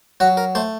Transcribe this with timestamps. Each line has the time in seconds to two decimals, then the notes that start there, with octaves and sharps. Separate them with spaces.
0.20 F#3 F#4
0.37 A#4
0.55 A3 C5